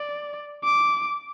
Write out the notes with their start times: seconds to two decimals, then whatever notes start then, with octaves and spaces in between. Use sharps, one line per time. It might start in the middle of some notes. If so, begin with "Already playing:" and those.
Already playing: D5
0.64 D6